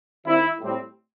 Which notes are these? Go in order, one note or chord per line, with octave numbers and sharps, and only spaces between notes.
D#3 G3 C4 E4
A2 G3 C4